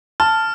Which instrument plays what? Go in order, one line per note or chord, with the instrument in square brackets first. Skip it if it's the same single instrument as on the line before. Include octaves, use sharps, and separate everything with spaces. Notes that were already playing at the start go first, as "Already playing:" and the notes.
[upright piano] A5 [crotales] F6